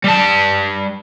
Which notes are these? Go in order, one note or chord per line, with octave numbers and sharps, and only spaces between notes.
G3 A5